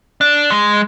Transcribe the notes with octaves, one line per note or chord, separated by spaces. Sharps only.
D4
G#3